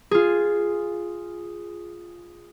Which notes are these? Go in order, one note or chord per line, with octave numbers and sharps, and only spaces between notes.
F4 G#4